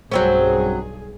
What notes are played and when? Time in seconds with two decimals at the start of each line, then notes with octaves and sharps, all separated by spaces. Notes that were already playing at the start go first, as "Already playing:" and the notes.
0.12 B1 G2 F#3 C4 C#4 G#4